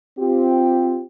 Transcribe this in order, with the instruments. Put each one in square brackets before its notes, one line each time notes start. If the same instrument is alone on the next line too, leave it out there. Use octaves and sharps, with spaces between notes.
[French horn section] C4 F4 G4